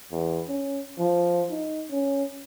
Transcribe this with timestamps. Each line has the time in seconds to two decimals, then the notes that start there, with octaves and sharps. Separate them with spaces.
0.12 E2
0.48 C#4
0.99 F3
1.50 D#4
1.91 C#4